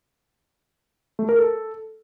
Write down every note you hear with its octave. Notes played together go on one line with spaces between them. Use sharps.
A3
A#4
A4